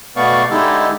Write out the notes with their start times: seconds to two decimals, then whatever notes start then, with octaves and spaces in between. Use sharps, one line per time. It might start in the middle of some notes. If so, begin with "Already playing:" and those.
0.16 B2 A3 B3 D5 F5 C#6
0.50 D3 G#3 D#4 E4 G4 A4